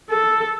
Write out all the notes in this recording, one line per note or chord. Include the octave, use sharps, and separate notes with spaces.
A4